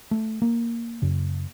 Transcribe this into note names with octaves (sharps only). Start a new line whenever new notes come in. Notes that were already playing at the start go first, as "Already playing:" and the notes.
A3
A#3
F#2 C#3